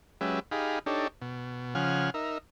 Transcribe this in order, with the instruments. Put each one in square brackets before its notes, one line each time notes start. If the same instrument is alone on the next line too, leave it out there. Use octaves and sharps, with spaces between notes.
[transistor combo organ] F#3 G#3 C#4 G4 B4 E5
D#4 G4 G#4 F5 B5
D4 D#4 G4 A4 C#5
B2
C#3 F3 F#5 G#5 F6
D#4 A#4 E5